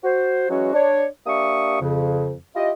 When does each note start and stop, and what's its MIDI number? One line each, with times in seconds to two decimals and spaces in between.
0.03 0.48 66
0.03 0.48 72
0.49 0.69 52
0.49 0.69 54
0.49 0.69 56
0.49 0.69 61
0.49 0.69 66
0.49 0.69 73
0.73 1.04 62
0.73 1.04 73
1.25 1.76 58
1.25 1.76 62
1.25 1.76 67
1.25 1.76 76
1.25 1.76 85
1.25 1.76 87
1.80 2.32 41
1.80 2.32 49
2.55 2.70 64
2.55 2.70 65
2.55 2.70 67
2.55 2.70 75